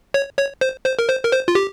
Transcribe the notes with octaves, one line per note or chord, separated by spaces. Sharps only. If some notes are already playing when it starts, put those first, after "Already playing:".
C#5
C#5
C5
C5
A#4
C5
A#4
C5
F4
G4